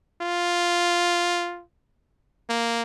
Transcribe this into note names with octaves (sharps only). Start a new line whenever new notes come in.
F4
A#3